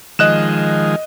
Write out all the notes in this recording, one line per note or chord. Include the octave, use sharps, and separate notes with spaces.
D#3 F3 G#3 D#5 F#6 E7